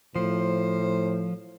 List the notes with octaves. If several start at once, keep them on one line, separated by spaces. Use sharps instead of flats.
A2 F3 C5